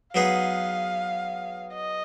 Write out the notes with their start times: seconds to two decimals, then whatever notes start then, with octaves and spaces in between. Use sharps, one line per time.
0.15 F#3 B3 D#4 G#4 B4 F5
1.74 D#5